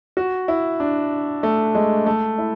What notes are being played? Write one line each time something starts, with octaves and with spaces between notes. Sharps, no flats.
F#4
E4
D4
A3
G#3
A3
E4